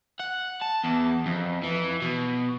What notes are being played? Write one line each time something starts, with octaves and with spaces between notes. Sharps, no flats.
F#5
A5
E2
F2
E3
B2